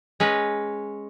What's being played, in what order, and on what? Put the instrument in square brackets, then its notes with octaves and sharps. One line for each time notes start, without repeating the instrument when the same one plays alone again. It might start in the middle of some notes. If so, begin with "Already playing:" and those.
[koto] G#3 C#4 B4